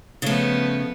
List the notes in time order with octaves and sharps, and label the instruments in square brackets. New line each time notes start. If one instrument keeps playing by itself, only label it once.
[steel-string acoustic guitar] C#3 A3 [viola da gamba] F3 B3